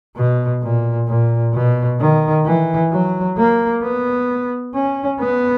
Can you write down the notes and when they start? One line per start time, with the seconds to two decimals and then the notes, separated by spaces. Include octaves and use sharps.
0.16 B2
0.62 A#2
1.07 A#2
1.53 B2
2.00 D#3
2.45 E3
2.92 F#3
3.37 A#3
3.82 B3
4.74 C#4
5.20 B3